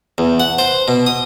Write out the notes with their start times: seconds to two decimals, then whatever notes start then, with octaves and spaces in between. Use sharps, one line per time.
0.18 E2
0.40 F#5
0.58 C5
0.88 B2
1.06 D#6